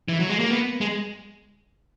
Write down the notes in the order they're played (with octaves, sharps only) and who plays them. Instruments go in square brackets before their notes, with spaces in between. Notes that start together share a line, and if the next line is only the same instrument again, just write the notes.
[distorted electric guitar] E3
F#3
G#3
A#3
B3
G#3